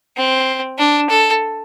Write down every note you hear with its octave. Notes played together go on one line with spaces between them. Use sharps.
C4
D4
A4